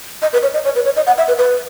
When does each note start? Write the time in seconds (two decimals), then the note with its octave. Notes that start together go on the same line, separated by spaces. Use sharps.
0.22 D#5
0.33 B4
0.43 C#5
0.54 D#5
0.65 C#5
0.75 B4
0.85 C#5
0.96 D#5
1.07 F#5
1.18 E5
1.28 B4
1.38 B4